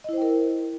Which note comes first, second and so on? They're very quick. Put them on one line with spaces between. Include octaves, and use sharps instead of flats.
D#5 E4 C5 G5 A#4